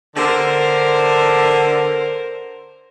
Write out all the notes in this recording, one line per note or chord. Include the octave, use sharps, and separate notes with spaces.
D3 A#4 C5